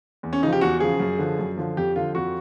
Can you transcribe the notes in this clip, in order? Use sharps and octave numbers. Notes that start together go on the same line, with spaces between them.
E2
C#4
C#3 F3 D#4
G4
E2 F#4
C#3 F3 G#4
F#2
D3 F3
F#2
D3 F3
F2 G4
D3 F3 F4
F2 F#4